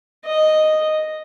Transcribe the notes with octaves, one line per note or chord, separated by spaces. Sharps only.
D#5